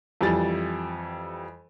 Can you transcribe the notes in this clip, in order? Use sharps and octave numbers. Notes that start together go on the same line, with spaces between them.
F2 E3 G3 A6